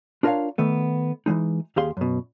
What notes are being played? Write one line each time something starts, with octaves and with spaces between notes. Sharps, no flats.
D4 F4 A#4 C5 C#5 F5
D#3 A3 B3
E3 F#3 G#3 D#4
D#2 G4 G#4 F5 C6
F#2 B2